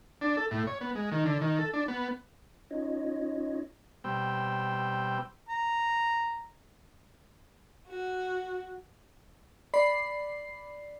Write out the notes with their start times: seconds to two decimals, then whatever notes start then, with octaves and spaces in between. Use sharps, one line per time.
0.21 D4
0.37 A4
0.51 A2
0.67 C#5
0.81 B3
0.95 G#3
1.12 D#3
1.25 D3
1.41 D#3
1.59 A4
1.74 D4
1.88 B3
2.71 C#4 D#4 F4 C#5 D#5
4.04 B2 G3 C4 G5 E6
5.49 A#5
7.87 F#4
9.74 D5 B5 C7